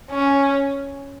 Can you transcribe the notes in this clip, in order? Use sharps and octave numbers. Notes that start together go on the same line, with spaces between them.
C#4